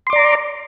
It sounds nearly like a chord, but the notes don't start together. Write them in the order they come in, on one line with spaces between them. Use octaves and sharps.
C6 D6 D5 A#5